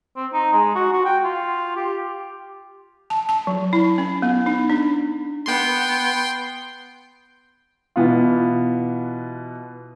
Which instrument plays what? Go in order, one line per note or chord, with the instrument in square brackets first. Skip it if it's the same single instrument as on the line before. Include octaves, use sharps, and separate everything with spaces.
[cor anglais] C4
D#4
G#3
F#4
F#4
G5
F4
G4
[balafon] A5
A5
F#3
E4
C#4
B3
D#4
D4
[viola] B3 [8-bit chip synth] G5 C6
[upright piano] B2 E3 B3 F4